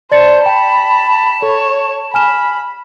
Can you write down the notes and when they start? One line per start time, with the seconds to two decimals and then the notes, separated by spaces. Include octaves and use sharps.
0.12 C5 D5 A5 A6 C#7
0.46 G5 B5
1.42 A4 C#5
2.14 G#5 B5 F6 E7